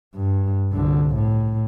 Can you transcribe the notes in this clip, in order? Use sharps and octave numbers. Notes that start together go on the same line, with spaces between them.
G2
C2 D3
A2